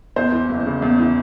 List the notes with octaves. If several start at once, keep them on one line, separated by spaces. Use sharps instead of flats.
E2 C5
E3
F#1
C#3
E2
E3